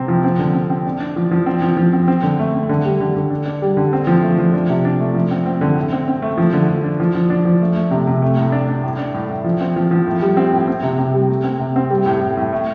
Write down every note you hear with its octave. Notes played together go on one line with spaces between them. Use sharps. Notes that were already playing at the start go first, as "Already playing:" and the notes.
Already playing: C3 C4
F3
C4
D3
C4
C4
D4
D4
F3
F3
C4
F3
F3
C4
C4
D3
A3
C4
D3
G3
D3
D3
D4
D4
G3
D3
C4
F3
A3
F3
D4
C3
D4
A3
F3
C4
C4
D3
A2
C4
C4
A3
F3
D3
F3
D4
F3
F3
D4
F3
A3
A3
C3
C3
A3
A2
D4
D4
A2
D4
A2
A2
F3
C4
F3
F3
A2
G3
C4
A2
C4
C3
C3
G3
A3
C4
C3
C4
G3
A2
A2
A2
A3